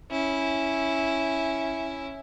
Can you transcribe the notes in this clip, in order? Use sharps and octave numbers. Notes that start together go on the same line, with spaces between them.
C#4 E4